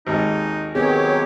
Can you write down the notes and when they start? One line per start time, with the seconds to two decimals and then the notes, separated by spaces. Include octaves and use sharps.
0.07 G#1 D#2 G#2 D#4
0.75 D#3 F#3 B3 C4 G4 G#4 C#5